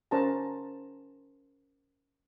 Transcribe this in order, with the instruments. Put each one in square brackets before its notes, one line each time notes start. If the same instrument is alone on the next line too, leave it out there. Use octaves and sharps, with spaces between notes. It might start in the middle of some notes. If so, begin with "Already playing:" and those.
[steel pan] C#4 A#4 C5 D5 A5 A#5